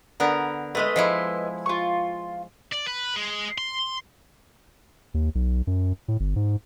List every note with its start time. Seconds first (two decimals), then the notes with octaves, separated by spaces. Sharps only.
0.20 D3 B3 A#4
0.75 G#3 A3 B4 D#5
0.96 F3 G#3 E4
1.66 F4 C#6
2.73 D5
2.88 B4
3.17 G#3
3.58 C6
5.14 D#2
5.35 B1
5.67 F#2
6.08 A2
6.20 G1
6.36 G#2